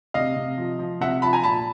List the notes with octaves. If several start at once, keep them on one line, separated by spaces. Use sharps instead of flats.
C3 D#5 F5
C3
F3
F3
C3 E5 F#5
F3 A5 B5
G#5 A#5
A#2 A5 B5